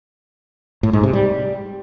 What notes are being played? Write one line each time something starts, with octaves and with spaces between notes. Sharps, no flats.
A2
G#2
C3
G3